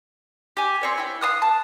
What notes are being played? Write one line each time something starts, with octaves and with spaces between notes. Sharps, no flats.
G4 G#5
C4 C#5 D5
E4 C#5 G5
F5 A5 D#6 F#6
A5